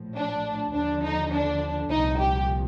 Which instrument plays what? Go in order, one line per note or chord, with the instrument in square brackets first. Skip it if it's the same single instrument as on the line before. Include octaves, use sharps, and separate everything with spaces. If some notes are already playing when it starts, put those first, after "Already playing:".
Already playing: [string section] A#1 A2 F3
D4
D#2 D3 F3 D4
D#4
D4
C2 A#2 F3 D#4
G4